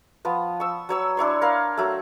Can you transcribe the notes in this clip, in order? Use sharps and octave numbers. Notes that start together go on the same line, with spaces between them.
F3 B3
C#6 E6
F#3 C#5 E6
D4 E4 C#5 C6
A#4 F5
F#3 A3